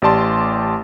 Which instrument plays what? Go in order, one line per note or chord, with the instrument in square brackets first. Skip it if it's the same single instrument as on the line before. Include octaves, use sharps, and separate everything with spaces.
[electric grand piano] A1 G4 D5 A5 C6 D6